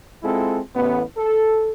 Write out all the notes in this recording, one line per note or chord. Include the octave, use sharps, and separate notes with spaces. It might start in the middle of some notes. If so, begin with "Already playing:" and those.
G#3 C4 E4 F4 A4
A1 B3
A4